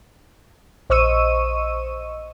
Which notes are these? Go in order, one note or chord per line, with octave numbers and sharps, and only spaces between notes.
A#1 C5 D#5 C#6 E6 D#7